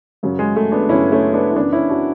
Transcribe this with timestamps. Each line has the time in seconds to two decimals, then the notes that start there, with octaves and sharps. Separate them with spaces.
0.23 F#2 C#3 F#3
0.39 G#3
0.56 A3
0.72 B3 D4
0.89 F#2 C#3 F#3 C#4 E4
1.12 A3 C#4
1.33 B3 D4
1.51 E4
1.56 F#2 C#3 E3 B3 D4
1.73 C#4 E4
1.89 D4 F#4